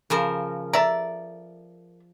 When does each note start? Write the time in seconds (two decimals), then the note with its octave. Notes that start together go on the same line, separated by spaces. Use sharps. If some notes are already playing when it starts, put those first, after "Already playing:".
0.10 C#3 F3 A#4
0.73 A4 D5 E5 A#5